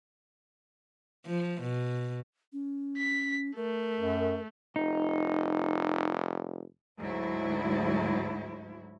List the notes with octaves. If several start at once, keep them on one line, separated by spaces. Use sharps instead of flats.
F3
B2
C#4
B6
A3 A#4
F#2
F1 D#4
D2 G#2 F#3 E4